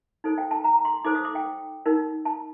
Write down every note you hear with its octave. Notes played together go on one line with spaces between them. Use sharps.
D#4 A4 C5
G5
A5
A#5
C6
D#4 A4 C5 D6
D#6
D6
G5
D#4 A#4
A5